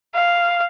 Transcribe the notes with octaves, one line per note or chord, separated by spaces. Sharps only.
F5